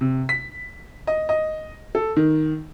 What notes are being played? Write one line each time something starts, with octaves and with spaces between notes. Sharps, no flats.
C3
B6
D#5
D#5
A4
D#3